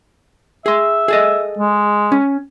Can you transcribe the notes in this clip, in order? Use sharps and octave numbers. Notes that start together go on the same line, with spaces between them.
G#4 E5 C6
G#4 A4 D#5
G#3
C#4